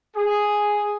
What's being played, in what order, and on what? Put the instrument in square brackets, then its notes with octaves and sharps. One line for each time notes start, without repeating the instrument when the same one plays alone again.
[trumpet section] G#4